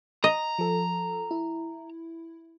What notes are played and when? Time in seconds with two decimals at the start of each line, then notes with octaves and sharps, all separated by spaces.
0.24 D#5 A#5
0.59 F3 A4
1.31 E4